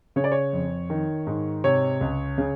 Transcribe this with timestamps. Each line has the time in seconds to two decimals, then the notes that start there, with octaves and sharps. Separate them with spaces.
0.16 C#3 C#5
0.24 D5
0.32 C#5
0.53 F2
0.90 D#3
1.27 G#2
1.64 C3 C#5
2.01 C#2
2.38 C#3